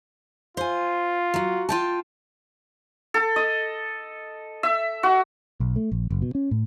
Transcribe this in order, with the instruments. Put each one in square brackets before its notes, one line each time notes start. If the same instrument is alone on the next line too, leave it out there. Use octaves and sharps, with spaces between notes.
[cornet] F4 [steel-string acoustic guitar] C5 G#5
[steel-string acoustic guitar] F#3 F#4
F4 G5 A5
[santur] A4
D#5
E5
F#4
[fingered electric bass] B1
A3
A#1
F#1
B2
C#4
A2